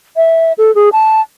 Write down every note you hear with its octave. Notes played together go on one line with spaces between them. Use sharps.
E5
A4
G#4
A5